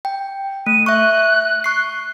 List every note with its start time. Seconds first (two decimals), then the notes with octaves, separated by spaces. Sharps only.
0.05 G5
0.66 A3 D#7
0.86 E5 C#6 F#6
1.64 C#6 C7